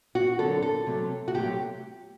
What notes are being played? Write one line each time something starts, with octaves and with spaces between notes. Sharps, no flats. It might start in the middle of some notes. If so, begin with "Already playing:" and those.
F#4
D3 F#3 C4 A4
A4
C3 F#3 A3
F#4
C3 F#3 A3 G4